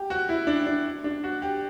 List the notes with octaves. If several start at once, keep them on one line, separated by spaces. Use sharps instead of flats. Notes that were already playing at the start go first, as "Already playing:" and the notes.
Already playing: G4
F#4
E4
D4
D4
D4
F#4
G4